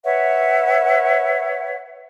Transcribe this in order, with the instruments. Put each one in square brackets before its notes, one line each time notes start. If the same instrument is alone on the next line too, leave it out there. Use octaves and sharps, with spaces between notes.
[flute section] B4 C#5 E5 F#5